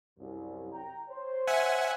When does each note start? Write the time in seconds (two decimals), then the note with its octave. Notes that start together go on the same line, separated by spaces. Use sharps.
0.19 C2 F#2
0.73 G5 A#5
1.10 C5 C#5
1.47 E5 F#5 G#5